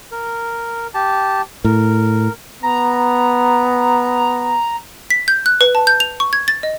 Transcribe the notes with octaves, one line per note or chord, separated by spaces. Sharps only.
A#4
G4 A5
A2 A#4
B3 A#5
B6
G6
F#6
B4
A5
G6
F7
C#6
G#6
A6
D#5